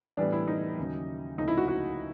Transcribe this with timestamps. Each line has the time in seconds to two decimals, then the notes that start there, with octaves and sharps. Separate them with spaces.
0.17 A2 E3 G3 B3 D4
0.33 E4
0.47 D#4
0.78 D#2 C#3 F#3
1.37 C#2 C3 F3 A3 D#4
1.48 E4
1.58 F#4
1.68 F#4